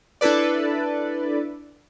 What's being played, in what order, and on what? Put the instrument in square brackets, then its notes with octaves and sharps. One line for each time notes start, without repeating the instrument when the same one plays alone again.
[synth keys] D4 E4 A4 B4 D5